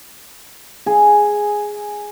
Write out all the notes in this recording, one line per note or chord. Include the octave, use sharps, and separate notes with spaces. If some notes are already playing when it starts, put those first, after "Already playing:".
G#4